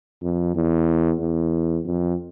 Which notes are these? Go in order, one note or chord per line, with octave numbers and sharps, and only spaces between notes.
F2
E2
E2
F2